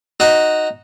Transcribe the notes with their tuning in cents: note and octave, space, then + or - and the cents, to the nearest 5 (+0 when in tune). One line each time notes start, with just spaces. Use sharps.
D#4 +0 F#4 +0